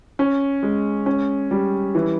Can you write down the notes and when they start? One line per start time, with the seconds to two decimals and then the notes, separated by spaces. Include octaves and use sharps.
0.19 C#4
0.63 G#3
1.06 C#4
1.51 G3
1.95 E3